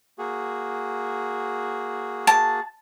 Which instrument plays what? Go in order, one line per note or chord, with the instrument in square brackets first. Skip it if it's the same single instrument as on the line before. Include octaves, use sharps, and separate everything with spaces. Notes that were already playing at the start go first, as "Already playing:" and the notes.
[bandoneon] A#3 F#4 G#4
[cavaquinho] A5